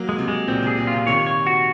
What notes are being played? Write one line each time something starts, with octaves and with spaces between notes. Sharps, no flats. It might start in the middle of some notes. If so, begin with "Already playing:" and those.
Already playing: F#3 A#3
G#3
C3
G#3
A#2 C4
C3 G#4
A#2
F4
C3
C3 D#3 C#5
C#5
F#4